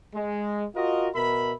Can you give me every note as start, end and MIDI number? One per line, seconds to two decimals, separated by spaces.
0.15 0.65 56
0.75 1.08 65
0.75 1.08 66
0.75 1.08 70
0.75 1.08 75
1.15 1.53 47
1.15 1.53 70
1.15 1.53 76
1.15 1.53 83